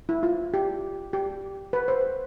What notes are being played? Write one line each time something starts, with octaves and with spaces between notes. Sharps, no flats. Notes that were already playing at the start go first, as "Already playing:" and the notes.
E4
F4
G4
G4
B4
C5